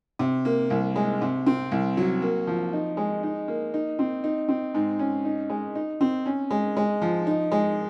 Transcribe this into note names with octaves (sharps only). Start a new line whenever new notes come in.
C3
A#3
C2
G#3
C3
C4
C2
F#3
A#3
F3
D#4
G#3
D#4
A#3
D#4
C4
D#4
C4
G#2
C#4
D#4
G#3
D#4
C4
C#4
G#3
G#3
F3
D#4
G#3